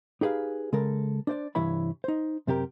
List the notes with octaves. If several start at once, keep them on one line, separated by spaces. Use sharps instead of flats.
D#4 G4 G#4 B4 F5
C#3 G#3 A4 A#4
D4 C5 D5
C2 G2 E3 E4 C#5 B5
D#4 C5
F#2 C3 G4 A#4